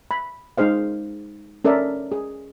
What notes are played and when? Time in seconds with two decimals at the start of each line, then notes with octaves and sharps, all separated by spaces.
0.11 B5
0.58 G#3 D#4 G#4 C5 F5
1.65 C#4 A4 A#4 D5 E5
2.12 G#4